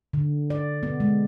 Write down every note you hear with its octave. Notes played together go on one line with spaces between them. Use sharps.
D3
D5
B3
G#3